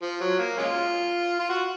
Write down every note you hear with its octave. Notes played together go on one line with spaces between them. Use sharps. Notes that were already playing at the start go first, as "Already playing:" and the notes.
F3
F#3
A#3
G#3 C#4 F4
F4
F#4